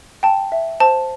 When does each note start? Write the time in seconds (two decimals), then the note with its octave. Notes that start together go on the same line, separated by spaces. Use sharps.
0.23 G5 A5
0.52 E5
0.80 C5 A5